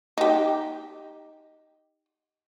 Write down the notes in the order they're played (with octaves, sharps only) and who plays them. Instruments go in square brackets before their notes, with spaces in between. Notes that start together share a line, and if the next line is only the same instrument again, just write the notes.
[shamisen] D#4 G4